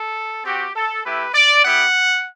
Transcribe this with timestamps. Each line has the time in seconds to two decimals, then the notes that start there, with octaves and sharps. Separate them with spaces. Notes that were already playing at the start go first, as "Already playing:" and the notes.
Already playing: A4
0.45 C4 F#4 G4
0.75 A4
1.04 A3 E4 G4 B4
1.34 D5
1.64 B3 E4 G4 F#5